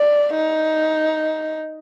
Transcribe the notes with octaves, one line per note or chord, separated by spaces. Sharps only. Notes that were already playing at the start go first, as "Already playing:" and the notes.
Already playing: D5
D#4